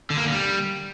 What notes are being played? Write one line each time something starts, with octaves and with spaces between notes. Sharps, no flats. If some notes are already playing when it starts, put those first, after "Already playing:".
D3
A#3
D3
G3